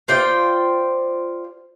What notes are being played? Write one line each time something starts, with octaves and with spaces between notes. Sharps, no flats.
F4 C5 D5 G5